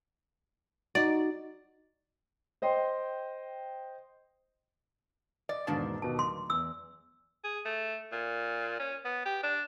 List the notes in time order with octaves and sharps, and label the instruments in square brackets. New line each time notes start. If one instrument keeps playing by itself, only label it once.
[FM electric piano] D#4 F#4 [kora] D5
[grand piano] C5 D#5 G5 C6
[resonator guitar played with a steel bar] D5 [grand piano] D#5
[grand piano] E2 G#2 B2 [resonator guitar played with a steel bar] D#3 A#3 D4
[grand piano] D#2 B2 [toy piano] A5
[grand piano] D1 [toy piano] C6
[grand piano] E2 [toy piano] E6
[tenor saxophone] G#4
A3
A#2
C#4
B3
G4
D4